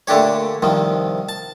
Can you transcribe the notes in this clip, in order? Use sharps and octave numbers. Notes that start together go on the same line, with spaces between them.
A#2 D3 A3 D4 G4 C#5
C2 D#3 F3
A5